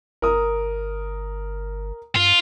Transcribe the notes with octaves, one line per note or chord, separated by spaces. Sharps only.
G1 A#4 D#6
G2 F4